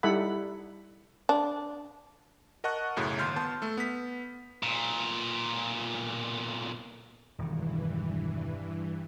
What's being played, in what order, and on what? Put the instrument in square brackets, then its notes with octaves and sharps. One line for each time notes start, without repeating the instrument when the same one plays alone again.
[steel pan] G3 D#4 E4 A4 F#5 B5
[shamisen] D4
[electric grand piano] A#4 D#5 F#5 A5 C#6 F#6
B1 F#2 A2 C#3
G1 D#2 C6 F6 G6
B3 A5 C6
A3 A4
B3 B6
[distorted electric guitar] B1 A#2
[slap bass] E1 D#3 [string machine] G2 E3